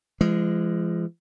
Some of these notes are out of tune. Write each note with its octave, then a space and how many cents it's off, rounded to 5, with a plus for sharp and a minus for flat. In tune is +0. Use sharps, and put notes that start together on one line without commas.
F3 -45 G#3 +0